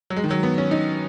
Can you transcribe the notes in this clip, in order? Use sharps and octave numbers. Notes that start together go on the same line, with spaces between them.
F#3
G#3
D#3
F#3
B3
C#4
D#4